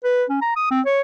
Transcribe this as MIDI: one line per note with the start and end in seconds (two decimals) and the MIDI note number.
0.04 0.24 71
0.30 0.39 61
0.42 0.55 82
0.56 0.66 87
0.71 0.81 60
0.86 1.01 73